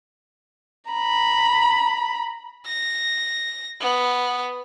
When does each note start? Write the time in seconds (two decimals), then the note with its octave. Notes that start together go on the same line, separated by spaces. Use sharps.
0.91 A#5 B5
2.66 A#6
3.80 B3